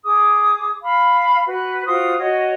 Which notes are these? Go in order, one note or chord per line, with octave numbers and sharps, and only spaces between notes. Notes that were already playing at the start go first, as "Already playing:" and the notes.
G#4 D6 D#6
F5 B5
F#4 B4
F4 F#4 C5 D#6
F#4 C#5 D#5